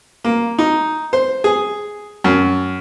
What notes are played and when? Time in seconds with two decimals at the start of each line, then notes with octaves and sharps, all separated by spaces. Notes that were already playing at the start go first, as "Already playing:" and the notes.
0.24 A#3
0.59 D#4
1.13 C5
1.44 G#4
2.24 F#2